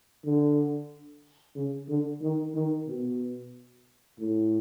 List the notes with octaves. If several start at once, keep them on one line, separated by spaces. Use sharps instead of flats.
D3
C#3
D3
D#3
D#3
B2
A2